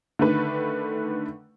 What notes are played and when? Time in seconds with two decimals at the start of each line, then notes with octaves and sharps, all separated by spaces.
0.19 D3 D#3 A3 B4